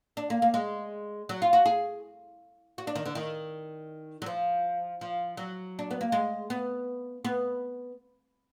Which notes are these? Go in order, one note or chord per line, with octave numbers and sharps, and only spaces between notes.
D4
A#3
A#3
G#3
F#3
F4
F#4
G#4
F#4
D4
D#3
D3
D#3
F#3
F3
F3
F#3
D4
B3
A#3
G#3
B3
B3